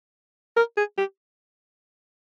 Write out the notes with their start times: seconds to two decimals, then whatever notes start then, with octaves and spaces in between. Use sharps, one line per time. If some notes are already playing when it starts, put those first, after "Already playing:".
0.56 A#4
0.77 G#4
0.98 G4